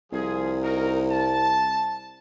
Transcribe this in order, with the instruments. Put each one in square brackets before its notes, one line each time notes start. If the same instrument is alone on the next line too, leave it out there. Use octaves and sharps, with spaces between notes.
[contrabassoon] C2 [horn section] F3 G#4
[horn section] D#4 F#4 A#4
A5